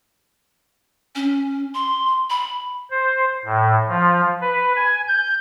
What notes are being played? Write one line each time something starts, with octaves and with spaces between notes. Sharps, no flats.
C#4
C6
B5
C5
A2
F3
B4
G#5
G6